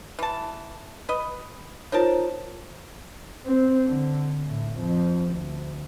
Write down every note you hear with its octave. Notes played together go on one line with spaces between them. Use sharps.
E3 A5
B4 D#5
D#4 F4 A#4 C5 C#5 A5
C4
D3
A2
F2
D2